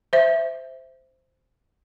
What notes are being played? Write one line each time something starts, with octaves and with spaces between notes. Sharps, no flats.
C5 E5